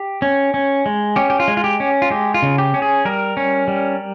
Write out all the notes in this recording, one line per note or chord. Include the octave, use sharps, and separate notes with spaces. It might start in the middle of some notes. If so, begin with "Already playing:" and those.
Already playing: G4
C#4
C#4
G#3
C#4 G4
G4
F4
G#3
F4
G4
C#4
F4
G#3 G4
F4
C#3
G4
C#4
G#4
G3 A#4
C#4
G3